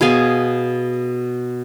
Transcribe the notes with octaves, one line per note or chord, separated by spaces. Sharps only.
B2 G#4 F5 G#5